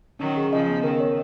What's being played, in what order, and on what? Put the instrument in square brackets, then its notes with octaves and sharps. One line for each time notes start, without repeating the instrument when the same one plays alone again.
[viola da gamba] D#3 F#3 [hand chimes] C#4
[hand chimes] G#4
[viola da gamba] C#3 F3 [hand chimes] D#5
[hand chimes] B3
[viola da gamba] D#3 [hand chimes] A#4
[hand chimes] C#5